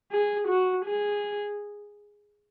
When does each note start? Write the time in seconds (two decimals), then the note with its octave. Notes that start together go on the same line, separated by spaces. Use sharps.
0.12 G#4
0.48 F#4
0.85 G#4